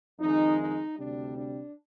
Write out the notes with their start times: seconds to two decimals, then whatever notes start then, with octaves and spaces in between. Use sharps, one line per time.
0.19 F2 D#3 G#3 D#4
0.59 D#4
0.98 D2 C3 G3 D4
1.37 D4